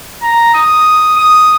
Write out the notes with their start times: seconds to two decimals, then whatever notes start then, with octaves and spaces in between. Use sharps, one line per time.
0.22 A#5
0.54 D#6
1.18 D#6